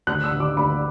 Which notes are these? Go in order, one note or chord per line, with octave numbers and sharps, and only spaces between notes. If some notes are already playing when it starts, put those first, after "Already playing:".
D2 F#6
E6
D3
D6
D2 B5